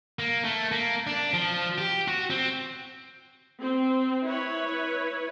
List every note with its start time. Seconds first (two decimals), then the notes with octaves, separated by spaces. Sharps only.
0.19 A#3
0.45 A3
0.72 A#3
1.07 D4
1.33 F3
1.78 G4
2.08 F#4
2.30 C4
3.60 C4
4.25 E4 B4 C#5